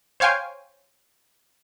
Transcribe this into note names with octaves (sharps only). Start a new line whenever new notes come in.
C5 C#5 F5 G5 G#5